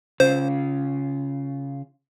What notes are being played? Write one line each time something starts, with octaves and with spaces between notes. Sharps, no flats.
C#3 F4 C5